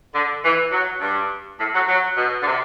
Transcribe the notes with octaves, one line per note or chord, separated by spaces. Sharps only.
D3
E3
F#3
G2
A2
F#3
F#3
B2
D3
C3